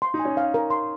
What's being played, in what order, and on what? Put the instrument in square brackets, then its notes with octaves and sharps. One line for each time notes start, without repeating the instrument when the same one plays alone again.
[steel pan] C6
[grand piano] D#4
[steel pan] G#5
[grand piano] C#4
[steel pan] F5
A#4
C6